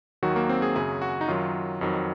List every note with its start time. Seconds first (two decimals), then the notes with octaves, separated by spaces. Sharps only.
0.23 D#2 D#3 F#3 F#4
0.36 A#3
0.49 C4
0.62 G#4
0.75 F#2 C#3 F#3 G#4
1.02 F#4
1.21 D#4
1.28 F#2 D#3 F#3 F4
1.81 F2 D#3 F#3